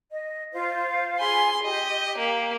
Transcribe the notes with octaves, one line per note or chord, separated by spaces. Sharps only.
D#5
F4 C5 F5
F4 G#4 G#5 B5 C6
G4 D#5
A#3